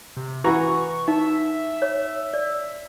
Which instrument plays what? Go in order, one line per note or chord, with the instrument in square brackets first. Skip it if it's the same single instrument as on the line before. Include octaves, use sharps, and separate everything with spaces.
[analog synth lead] C3
[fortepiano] E3 F#4 A#5 [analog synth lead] C#6
[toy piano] D#4 [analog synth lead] E5
[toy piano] C#5
D5